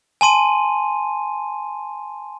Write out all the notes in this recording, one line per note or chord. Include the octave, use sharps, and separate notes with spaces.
G#5 A5 C6 D#7